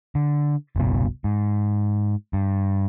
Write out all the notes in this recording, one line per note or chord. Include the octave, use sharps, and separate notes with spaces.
D3
F#1 C2 B2
G#2
G2